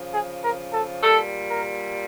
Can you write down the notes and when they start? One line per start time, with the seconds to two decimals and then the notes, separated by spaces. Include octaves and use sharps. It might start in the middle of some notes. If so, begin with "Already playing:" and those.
Already playing: C#3 F3
0.12 G#4
0.43 A#4
0.73 A4
1.03 A#2 G3 A4
1.49 A#4